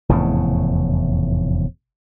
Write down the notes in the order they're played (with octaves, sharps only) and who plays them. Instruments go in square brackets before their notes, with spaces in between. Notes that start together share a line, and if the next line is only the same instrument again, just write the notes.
[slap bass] F1 E2 A2 C#3